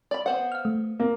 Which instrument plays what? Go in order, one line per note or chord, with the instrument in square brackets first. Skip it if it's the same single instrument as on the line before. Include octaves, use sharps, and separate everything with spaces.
[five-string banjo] D5 B5
B3 C5 F#5
[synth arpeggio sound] F5 F6
A3
[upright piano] A#3